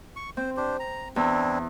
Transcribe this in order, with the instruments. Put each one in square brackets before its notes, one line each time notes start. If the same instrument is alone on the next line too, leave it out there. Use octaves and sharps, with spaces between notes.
[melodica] C#6
[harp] C4 [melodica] C5
[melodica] D4 G4 C5
A#5
[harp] E2 [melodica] C4 D4 E4